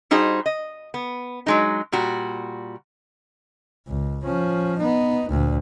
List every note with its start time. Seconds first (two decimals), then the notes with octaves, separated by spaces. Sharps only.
0.11 G3 D#4 F#4 G#4 C5
0.46 D#5
0.94 B3
1.46 F#3 G#3 D#4
1.92 A#2 G3 F#4
3.88 C#2
4.24 F3 C#4
4.79 B3 D#4
5.30 D2 A#2